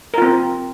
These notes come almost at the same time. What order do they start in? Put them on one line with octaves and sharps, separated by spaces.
A#4 F4 C4